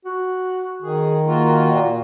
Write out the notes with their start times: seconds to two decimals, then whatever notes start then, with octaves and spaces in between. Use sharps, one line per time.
0.05 F#4
0.82 D#3 G#4
1.25 A#3 F4 F#4
1.71 A#2